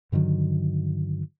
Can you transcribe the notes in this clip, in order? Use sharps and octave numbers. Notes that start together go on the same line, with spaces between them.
G2 D3 D#3 F#3